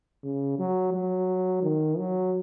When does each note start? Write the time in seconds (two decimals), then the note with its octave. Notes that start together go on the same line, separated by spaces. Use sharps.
0.24 C#3
0.59 F#3
0.94 F#3
1.63 D#3
1.98 F#3